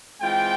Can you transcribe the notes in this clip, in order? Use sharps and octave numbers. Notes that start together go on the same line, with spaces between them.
E3 G#3 C4 F4 G5